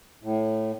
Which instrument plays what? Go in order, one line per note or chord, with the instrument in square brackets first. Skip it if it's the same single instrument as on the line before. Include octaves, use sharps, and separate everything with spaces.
[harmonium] A2